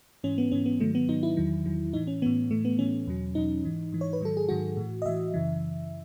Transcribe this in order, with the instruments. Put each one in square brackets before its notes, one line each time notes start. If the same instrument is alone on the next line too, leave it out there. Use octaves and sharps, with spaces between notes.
[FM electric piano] G#2 E3 C#4
B3
G#2 E3 C#4
B3
G#2 D#3 F#3 A3
B3
G#2 D#3 F#3 D#4
E4
E2 D#3 F#3
E2 D#3 F#3
A2 E3 D#4
C#4
A2 E3 B3
A2 E3 A3
B3
A2 E3 C#4
E2 B2 F#3
E2 B2 F#3 D#4
G#2 E3
G#2 E3
C#5
B4
G#2 D#3 F#3 A4
G#4
G#2 D#3 F#3 F#4
A2 E3
D#5
A2 E3 E5
F#2 C#3 E3